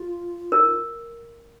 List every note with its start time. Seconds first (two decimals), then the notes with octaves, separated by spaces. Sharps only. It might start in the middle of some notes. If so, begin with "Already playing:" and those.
Already playing: F4
0.52 D#4 A#4
0.65 F4